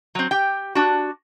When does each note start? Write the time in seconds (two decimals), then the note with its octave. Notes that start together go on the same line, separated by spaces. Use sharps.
0.15 F#3 C4
0.31 G4 G5
0.75 D4 F#4